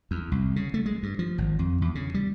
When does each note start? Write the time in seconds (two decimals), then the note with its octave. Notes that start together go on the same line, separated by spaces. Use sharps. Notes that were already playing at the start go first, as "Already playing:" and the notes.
0.11 E2
0.32 C2
0.56 C#3
0.74 A3
0.86 G#3
1.03 G2
1.19 F3
1.38 G#1
1.59 F2
1.82 E2
1.95 C#3
2.14 G3